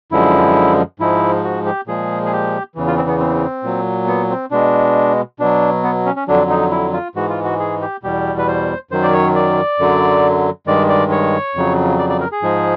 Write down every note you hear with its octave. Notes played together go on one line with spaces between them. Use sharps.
F#2 D3 F3 G#3 E4
G#2 F3 G#3 E4
F#4
G4
A#2 F3 G#3 G#4
G#4
G4
E2 C#3 E3
F4
C4
B3
C4
A#2 F#3
B3
C4
B2 G#3 D4
B2 F#3 D4
B3
C#4
C#4
F2 D3 F#3 D4
D#4
E4
F4
G#2 E3 G#3 F#4
F4
F#4
G#4
G4
E2 B2 G3 G4
B4
C5
F#2 D#3 F#3 C5
D5
C#5
D5
F#2 D3 F#3
G2 D#3 G#3 D5
D5
C#5
F2 C#3 F#3
D5
D5
A#4
G#4
G#2 F3 G#3